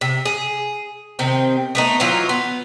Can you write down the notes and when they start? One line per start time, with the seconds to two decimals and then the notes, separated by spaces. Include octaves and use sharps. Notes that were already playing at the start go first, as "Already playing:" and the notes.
0.01 C3
0.25 G#4
1.19 C3 D#3 C4
1.75 A3 B3 D#4
2.00 E3 F#3 D#4 F4
2.29 B3